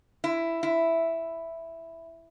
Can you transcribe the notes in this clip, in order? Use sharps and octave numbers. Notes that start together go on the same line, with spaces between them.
E4
E4